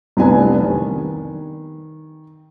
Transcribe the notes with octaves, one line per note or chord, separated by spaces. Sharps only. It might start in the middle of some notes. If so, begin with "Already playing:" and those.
F1 C2 B3 D4 G#5
D#3